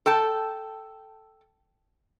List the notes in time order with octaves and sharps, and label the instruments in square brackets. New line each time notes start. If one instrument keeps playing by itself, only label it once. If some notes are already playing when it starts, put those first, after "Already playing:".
[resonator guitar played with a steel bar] A4 G5 A5